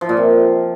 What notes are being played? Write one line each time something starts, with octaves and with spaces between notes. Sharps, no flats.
F3
A#2
C3